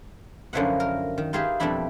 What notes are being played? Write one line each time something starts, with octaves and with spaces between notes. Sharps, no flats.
F#2 D3 F3 E4 B4 F#5
A#4
D#3
D#4 F4 G4 G#4 B4 E5
F2 B2 G3 D4 E4 B5